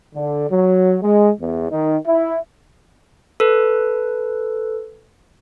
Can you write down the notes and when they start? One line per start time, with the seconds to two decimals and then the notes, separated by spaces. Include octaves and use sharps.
0.15 D3
0.50 F#3
1.03 G#3
1.40 E2
1.70 D#3
2.06 E4
3.40 A4 B4